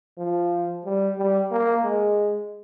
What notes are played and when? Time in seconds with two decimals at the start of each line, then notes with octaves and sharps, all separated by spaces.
0.18 F3
0.85 G3
1.18 G3
1.51 A#3
1.84 G#3